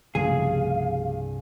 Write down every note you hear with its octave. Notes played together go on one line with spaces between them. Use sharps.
C2 G2 C#3 F3 A3 G#4 F5